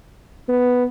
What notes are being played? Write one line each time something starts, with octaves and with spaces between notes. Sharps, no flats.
B3